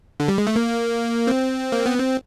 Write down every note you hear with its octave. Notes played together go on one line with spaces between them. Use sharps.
D3
G3
G#3
A3
A#3
C4
A#3
B3
C4